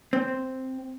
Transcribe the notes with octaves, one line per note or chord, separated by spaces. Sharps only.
C4